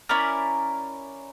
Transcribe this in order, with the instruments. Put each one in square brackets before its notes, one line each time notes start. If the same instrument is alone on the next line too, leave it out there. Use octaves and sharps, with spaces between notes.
[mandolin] C#4 E4 A#4 D5